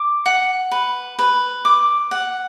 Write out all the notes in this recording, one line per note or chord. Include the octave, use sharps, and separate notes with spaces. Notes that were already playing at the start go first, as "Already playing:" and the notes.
Already playing: D6
F#5
B4
B4
D6
F#5